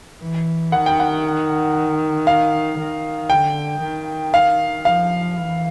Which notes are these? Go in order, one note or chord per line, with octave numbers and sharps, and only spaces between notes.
E3
D#3 F#5
G5
F#5
F5
D#3
D3 G5
D#3
F5
F3 F5
E3